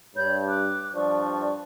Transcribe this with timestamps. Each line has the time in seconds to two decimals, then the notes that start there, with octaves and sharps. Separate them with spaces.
0.16 G2 C#5 B5 G6
0.48 D6 F#6
0.95 G2 F3 D4 D5 C#6